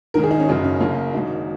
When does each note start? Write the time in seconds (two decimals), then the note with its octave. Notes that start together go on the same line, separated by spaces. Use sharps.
0.14 G#1 G#2 D#3 A#4
0.24 G#4
0.31 D#4
0.40 C#4
0.48 F#1 F#2 C#3 F#3 D#4
0.64 C#4
0.80 F#1 F#2 C#3 A#3
1.13 G#1 G#2 F#3 D#4